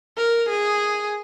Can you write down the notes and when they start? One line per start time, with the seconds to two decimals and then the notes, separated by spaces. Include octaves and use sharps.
0.17 A#4
0.49 G#4